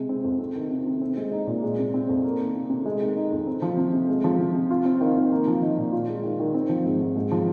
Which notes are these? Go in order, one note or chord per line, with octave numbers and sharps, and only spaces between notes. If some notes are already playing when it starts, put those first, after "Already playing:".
Already playing: C3 G#3
C4
F2
C4
D#3
C3
C3
C4
G#3
D#4
A#2
G#3
C3
C4
F2
A#3
D#3
C3
C3
G#3
D#3
D#4
F2
C4
F3
C3
C3
G#3
F3
C3
C3
F4
C4
D#3
D#3
A#3
F3
D#4
A#2
F4
G#3
D#3
D#3
C4
F3
G#2
G#2
G#3
F3